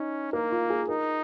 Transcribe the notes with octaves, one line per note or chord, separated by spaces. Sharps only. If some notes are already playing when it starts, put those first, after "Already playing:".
Already playing: C#4 D#4
A#3 A#4
F4
G#4
D#4 A#4